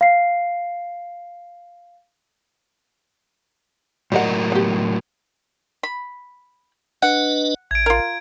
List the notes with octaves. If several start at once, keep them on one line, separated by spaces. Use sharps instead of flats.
F5 C7
A2 F#3 G3 A#4 D#5 F#5
B3 G4
B5
D4 B4 D#5 F#5
A1 G#6 D7
F4 A#4